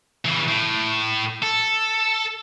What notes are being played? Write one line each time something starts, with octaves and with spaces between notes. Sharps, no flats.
C#3 E3
A2
A4